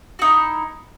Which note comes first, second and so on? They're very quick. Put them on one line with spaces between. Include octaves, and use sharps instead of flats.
F#4 D#4 E4